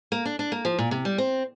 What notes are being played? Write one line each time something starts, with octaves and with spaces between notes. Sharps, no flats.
A#3
D4
D4
A#3
F3
A#2
C3
G3
C4